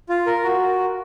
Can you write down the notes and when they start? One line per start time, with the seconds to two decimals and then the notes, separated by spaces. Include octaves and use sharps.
0.09 F4
0.27 A#4
0.44 F#4